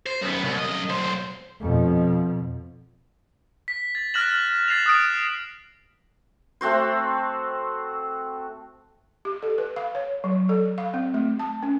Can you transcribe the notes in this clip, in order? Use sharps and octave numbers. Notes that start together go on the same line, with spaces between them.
C5
F#2 B3
C2
F#2 D#5
B1 C5
F2 B2
B6
A6
F6 F#6 A6 A#6 E7 F#7
A6 C7 E7 F7
D#6 F#6 D7
A3 C4 F#4 C5
G4
A4
B4
F5
C#5
F#3
A4
F5
C4
A3
A5
C#4